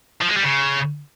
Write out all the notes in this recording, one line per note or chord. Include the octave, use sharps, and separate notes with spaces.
F3
G#3
G3
C#3